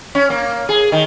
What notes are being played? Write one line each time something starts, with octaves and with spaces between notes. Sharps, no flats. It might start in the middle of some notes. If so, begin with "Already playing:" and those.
C#4
A#3
G#4
D#3